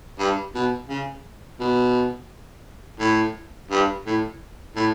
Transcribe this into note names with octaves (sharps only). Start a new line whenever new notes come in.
G2
B2
C#3
B2
A2
G2
A2
A2